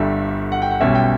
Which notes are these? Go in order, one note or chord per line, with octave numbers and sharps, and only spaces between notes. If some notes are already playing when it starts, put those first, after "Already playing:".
Already playing: G1 G2 D3 G3 D4 E5
F#5
G5
F#5
B1 B2 G3 C#4 E5
G5